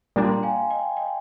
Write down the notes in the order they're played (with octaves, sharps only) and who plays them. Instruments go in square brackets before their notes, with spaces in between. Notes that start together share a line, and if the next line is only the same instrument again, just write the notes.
[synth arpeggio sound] A#2 G3 A#3 D4 [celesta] A#5
[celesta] C6
G5 A#5
F5 G#5
D#5 G5
D#5 G5